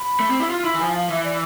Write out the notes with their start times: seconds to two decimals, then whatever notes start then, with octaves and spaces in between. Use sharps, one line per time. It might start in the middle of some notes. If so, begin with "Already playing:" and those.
Already playing: B5
0.20 A3
0.30 C4
0.40 E4
0.49 F4 C6
0.64 E4 B5
0.74 E3
0.79 F3 G#5
0.95 F5
1.09 E3 E5
1.24 D5